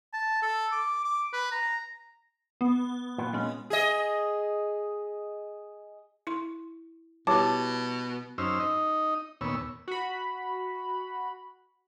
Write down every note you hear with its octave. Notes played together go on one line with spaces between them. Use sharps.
A5
A4
D6
D6
B4
A#5
B3
A#2 B3
G#3 C#4
G#4 D#5
E4 C6
B2 G3 E4 G4 C#5 A5 D6
F#2 C#4 D#4 C5 E6 F6
D#4 D#5
D#2 A#2 B3 C#5 E6
F#4 B5